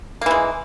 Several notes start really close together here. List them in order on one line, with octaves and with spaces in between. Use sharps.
A#3 E3 G#3